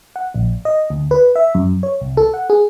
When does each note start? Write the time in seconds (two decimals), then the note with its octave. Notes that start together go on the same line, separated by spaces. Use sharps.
0.16 F#5
0.34 A#1
0.65 D#5
0.90 D2
1.11 B4
1.36 E5
1.55 F#2
1.83 C#5
2.01 C2
2.17 A4
2.34 F#5
2.50 G#4